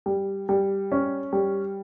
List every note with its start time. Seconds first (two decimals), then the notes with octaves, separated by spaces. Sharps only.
0.06 G3
0.49 G3
0.92 C#4
1.33 G3